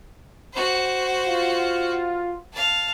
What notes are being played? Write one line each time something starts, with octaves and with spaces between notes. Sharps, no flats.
F#4 C5
F4
F5 A5